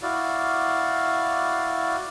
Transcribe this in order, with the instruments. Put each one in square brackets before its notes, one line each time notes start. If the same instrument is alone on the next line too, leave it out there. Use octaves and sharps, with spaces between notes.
[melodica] E4 F#4 D5 F5